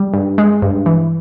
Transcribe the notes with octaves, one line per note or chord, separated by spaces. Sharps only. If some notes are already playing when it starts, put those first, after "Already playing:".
Already playing: G3
G2
G#3
G2
E3